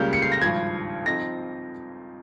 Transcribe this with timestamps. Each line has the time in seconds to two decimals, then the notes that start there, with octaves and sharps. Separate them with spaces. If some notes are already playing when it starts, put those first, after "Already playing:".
Already playing: C#2 C#3 G3 A#3 G6
0.13 C#7
0.22 C7
0.32 A#6
0.41 G#1 G2 F3 G#6
1.06 F3 C4 D#4 A#6